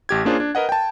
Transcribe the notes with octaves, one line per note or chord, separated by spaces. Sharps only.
A1 G4 G#6
A#3 C#4 D4 F4 G#4 C5
D4
A#4 B4 D#5 F#5
G5 A5